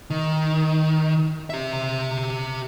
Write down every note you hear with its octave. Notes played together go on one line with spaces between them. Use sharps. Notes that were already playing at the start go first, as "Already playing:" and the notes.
D#3
G4 E5